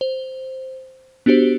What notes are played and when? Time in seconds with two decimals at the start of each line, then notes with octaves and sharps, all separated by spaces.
0.01 C5
1.26 B3 D4 F#4 G4 C5